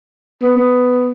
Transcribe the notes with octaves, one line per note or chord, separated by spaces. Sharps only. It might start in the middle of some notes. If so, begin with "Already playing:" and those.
B3
B3